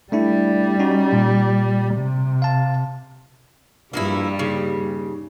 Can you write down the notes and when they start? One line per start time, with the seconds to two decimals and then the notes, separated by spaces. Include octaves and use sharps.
0.12 G3 A3 D4 E4
0.79 C#4 D#4 F#4
1.13 A#2
1.95 C3
2.42 F5 A5
3.93 A#1 G2 G3 A#3 D#4 E4
4.39 D#2 C#3